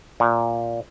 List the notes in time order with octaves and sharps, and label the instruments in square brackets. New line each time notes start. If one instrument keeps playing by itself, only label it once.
[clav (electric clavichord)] A#2